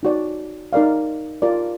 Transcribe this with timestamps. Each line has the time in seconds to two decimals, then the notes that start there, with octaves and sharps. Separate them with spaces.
0.03 D#4 F#4 D5
0.73 D#4 A#4 D5 F5
1.42 F4 A#4 D5